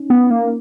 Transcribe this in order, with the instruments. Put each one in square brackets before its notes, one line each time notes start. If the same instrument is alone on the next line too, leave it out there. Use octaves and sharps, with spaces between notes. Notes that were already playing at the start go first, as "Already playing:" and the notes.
Already playing: [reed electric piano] C#4 D#4
[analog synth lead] B3
A#3